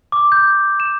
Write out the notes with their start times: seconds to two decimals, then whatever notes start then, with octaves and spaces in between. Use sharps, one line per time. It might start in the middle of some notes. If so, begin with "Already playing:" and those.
0.12 D6
0.32 G6
0.80 E7